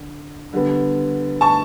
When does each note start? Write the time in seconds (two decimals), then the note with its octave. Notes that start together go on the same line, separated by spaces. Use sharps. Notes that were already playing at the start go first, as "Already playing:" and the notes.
Already playing: D3
0.53 D3 G3 B3
1.41 A5 C#6